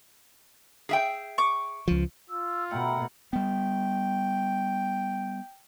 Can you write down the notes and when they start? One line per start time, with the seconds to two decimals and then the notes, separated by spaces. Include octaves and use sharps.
0.89 G#4 E5 G5
1.38 C#6 D6
1.88 C#2 F3
2.30 F4 E6
2.71 B2 A3 E4 A#4 F#5 G5
3.33 G3 B3 G5